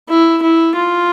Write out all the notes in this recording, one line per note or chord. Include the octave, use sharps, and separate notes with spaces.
E4
E4
F4